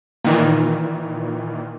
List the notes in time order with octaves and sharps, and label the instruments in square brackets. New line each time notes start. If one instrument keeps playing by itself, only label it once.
[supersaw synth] A#2 D#3 E3